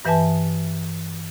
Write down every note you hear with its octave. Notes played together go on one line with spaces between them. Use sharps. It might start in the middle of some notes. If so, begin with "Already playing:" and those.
G2 E3 B4 E5 G#5 A5